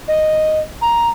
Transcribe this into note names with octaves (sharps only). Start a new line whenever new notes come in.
D#5
A#5